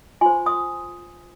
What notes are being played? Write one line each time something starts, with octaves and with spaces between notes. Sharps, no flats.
F4 C5 G#5 C6
C6 D#6